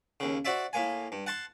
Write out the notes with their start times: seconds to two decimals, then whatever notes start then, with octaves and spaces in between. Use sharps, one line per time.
0.20 D#2 C#3
0.45 F#4 C5 D5 E5
0.73 A2 A#3 G#5
1.12 G2
1.26 F#5 A5 C6